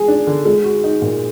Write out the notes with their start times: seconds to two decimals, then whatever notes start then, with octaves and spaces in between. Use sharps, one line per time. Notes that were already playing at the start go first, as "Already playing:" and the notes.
Already playing: G#3 G#4
0.08 D4
0.27 D3
0.45 G#3
0.64 F#4
0.84 D#4
1.02 A#2